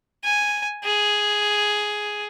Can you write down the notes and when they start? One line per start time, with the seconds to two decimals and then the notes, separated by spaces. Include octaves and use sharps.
0.24 G#5
0.84 G#4